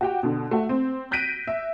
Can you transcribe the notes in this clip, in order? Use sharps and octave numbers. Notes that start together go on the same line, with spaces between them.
F#4 G4 G5
B2 D3
A3 F#4
C4
F#6 G6 A#6 B6 D7 D#7
E5